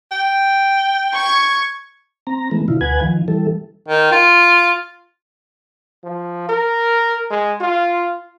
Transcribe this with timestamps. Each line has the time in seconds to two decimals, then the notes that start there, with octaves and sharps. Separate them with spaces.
0.12 G5
1.13 C#6 G#6
2.27 C4 A#5
2.51 E3 G#3 A3 B3
2.68 B2 D3 E4 F4
2.81 D2 B4 F#5 G#5 G#6
3.01 D#3 F3
3.28 E3 G3 A4
3.88 D#3
4.12 F4
6.04 F3
6.49 A#4
7.31 G#3
7.61 F4